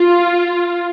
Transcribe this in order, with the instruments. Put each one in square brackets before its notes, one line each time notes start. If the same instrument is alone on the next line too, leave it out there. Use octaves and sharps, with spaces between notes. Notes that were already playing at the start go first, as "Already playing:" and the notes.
Already playing: [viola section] F4